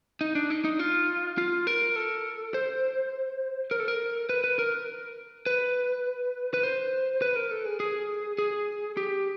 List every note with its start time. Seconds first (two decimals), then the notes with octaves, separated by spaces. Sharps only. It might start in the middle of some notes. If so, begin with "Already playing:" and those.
0.21 D#4
0.35 D4
0.50 D#4
0.64 D#4
0.79 F4
1.38 F4
1.67 A#4
1.96 A4
2.54 C5
3.71 A#4
3.80 A4
3.88 A#4
4.29 B4
4.44 B4
4.59 A#4
5.46 B4
6.54 B4
6.63 C5
7.22 B4
7.36 A#4
7.51 A4
7.65 G#4
7.80 G#4
8.38 G#4
8.97 G4